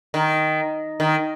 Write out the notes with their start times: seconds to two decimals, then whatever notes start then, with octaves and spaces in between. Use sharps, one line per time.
0.14 D#3
1.00 D#3